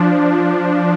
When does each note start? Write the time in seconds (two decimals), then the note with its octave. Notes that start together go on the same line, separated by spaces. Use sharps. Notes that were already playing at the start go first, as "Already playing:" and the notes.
Already playing: F3 D4